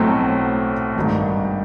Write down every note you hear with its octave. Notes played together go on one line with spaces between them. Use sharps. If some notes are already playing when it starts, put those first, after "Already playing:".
Already playing: B1 A2 F#3 A3 C4
G#1 G2 D#3